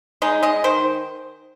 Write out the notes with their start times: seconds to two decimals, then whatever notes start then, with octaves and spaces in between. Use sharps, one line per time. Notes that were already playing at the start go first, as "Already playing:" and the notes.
0.22 G#3 D#4
0.43 G#3 D#5
0.64 D#3 C5